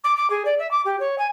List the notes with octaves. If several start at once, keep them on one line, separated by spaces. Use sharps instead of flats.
D6
D6
G#4
D5
E5
D6
G4
C#5
G#5